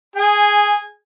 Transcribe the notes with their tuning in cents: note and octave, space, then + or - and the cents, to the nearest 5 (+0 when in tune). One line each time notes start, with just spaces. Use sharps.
G#4 +0 G#5 -15